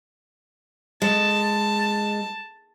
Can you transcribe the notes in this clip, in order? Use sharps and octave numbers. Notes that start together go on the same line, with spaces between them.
G#3 A5